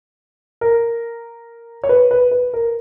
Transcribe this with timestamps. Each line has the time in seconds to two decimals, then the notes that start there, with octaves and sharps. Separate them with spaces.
0.61 A#4
1.84 C#5
1.89 B4
2.11 B4
2.31 B4
2.54 A#4